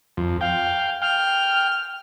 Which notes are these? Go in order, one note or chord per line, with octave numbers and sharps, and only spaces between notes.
F2
F5 G5
G5 F6